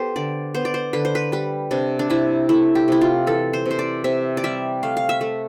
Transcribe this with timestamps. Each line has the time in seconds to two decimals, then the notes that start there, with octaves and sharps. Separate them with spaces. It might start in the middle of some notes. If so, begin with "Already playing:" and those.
Already playing: B3 G4 A4 C5
0.16 D3 D5
0.54 B3 C5
0.65 D5
0.74 C5
0.93 D3 B4
1.05 C5
1.15 B4
1.32 G3 B4
1.71 C3 D4
1.99 D4
2.10 C3 E4
2.49 A3 E4
2.75 G4
2.88 C3 E4
3.01 F4
3.27 E3 A4
3.53 C5
3.65 C3
3.71 C5
3.79 D5
4.04 C3 E5
4.37 D5
4.44 G3 E5
4.83 A3 F5
4.97 F5
5.09 E5
5.21 A3